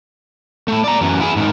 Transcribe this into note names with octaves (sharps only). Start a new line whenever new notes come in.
A3 E4
D5 A#5
F#2 E3
E4 G#4
G#2 D#3